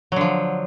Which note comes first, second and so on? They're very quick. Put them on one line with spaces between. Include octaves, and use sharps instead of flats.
F#3 D3 F3